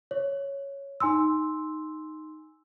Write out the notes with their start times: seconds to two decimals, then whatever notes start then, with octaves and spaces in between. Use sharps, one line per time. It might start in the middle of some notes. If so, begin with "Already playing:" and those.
0.11 C#5
1.00 D#4 G#5 C6 E6